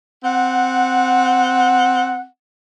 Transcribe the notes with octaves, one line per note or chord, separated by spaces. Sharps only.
C4 F#5